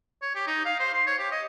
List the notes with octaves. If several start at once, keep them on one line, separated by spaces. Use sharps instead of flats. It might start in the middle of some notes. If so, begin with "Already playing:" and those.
C#5
G4
D#4
F5
C5
C6
C#5
G4
D#5